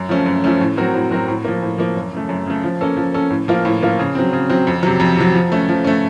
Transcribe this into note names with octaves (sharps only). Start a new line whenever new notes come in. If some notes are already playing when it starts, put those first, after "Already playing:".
Already playing: F#2
F3 A3 C#4
F#2
F3 A3 C#4
A2
F#3 C4 F#4 A#4
A2
F#3 C4 F#4 A#4
A2
F3 A#3
A2
F3 A#3
F#2
C#3 A3
F#2
C#3 A3
F3
A#3 C#4 A4
F3
A#3 C#4 A4
A2
F3 A#3 F4
A2
F3 A#3 F4
C#3
F#3 C4
C#3
F#3 C4
F2
C3 F#3
F2
C3 F#3
F3
A3 C#4
F3
A3 C#4